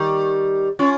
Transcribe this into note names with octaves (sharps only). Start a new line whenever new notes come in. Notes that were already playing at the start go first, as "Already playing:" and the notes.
Already playing: D#3 G3
C#4 F4